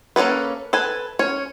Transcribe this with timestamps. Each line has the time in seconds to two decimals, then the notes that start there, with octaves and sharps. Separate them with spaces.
0.16 A#3 C#4 G#4 A4 B4
0.73 A4 B4 G#5
1.19 C#4 C#5